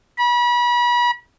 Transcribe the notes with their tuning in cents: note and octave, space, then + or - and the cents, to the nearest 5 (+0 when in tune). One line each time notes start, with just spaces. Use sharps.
B5 -35